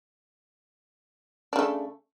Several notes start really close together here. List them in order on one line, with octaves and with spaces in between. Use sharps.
D4 C#3 A3